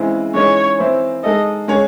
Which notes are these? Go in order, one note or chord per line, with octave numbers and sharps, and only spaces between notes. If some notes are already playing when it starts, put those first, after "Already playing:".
Already playing: C#3 E3 G#3 C4 E4
C#3 E3 G#3 D#4 C#5
E3 C4 E4 C5
G#3 D#4 A4 D#5
G#3 C#4 G#4 C#5